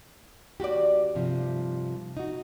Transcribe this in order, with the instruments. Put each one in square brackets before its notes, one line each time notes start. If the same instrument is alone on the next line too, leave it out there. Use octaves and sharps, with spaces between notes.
[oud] D#2 D5 [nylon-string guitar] F#4 G4
[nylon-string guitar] G2 C3 F3
D#4 F#4